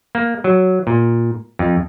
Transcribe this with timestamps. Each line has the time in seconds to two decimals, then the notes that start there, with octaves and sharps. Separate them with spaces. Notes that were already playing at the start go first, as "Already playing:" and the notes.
0.15 A#3
0.44 F#3
0.87 A#2
1.59 F2